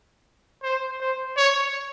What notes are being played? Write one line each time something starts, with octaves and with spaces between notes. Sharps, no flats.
C5
C5
C#5